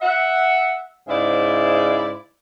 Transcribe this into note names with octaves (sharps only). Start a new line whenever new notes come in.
E5 F#5
G#2 C#3 E4 C5 D5 E5